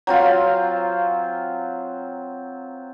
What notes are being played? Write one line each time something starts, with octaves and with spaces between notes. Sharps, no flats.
F#3 C4 F4 F5